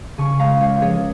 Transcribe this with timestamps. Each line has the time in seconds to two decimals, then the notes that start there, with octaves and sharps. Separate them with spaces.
0.18 C#3 G#5 C#6
0.39 G#3 F5 A#5
0.61 C#2 C#5 F5
0.82 F3 G#4 C#5